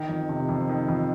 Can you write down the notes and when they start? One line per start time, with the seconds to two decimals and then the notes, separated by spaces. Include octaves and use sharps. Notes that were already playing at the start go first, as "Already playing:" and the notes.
Already playing: D#3
0.09 F2
0.29 C3
0.49 F2
0.69 D#3
0.88 F2